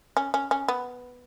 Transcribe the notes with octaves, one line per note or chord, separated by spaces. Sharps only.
C#4
C#4
C#4
B3